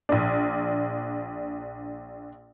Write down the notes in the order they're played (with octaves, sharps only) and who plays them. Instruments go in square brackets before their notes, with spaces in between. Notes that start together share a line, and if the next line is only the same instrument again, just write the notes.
[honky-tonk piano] A#1 D4